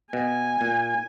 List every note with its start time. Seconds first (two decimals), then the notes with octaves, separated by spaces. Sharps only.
0.13 B2 G#5
0.61 A#2